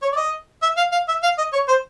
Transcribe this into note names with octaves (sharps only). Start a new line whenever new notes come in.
C#5
D5
D#5
E5
F5
F5
E5
F5
D#5
C#5
C5